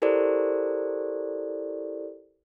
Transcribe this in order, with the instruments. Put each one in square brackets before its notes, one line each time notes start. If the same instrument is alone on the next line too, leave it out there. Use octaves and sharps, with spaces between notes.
[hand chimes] E4 G4 A4 A#4 C5 D5